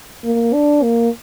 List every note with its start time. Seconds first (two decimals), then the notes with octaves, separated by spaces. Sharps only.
0.24 A#3
0.53 D4
0.83 A#3